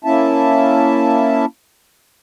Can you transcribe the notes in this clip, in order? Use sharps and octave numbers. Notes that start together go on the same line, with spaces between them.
A#3 C#4 E4 E5 A5